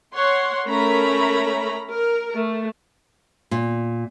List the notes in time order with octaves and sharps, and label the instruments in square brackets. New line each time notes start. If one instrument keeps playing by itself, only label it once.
[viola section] C#5 F#5 C6
A3 C#4 A#4 A#5 B5
A#4
A3
[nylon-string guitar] A#2